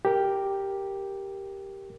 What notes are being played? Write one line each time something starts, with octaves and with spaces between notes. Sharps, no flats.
G4 A#4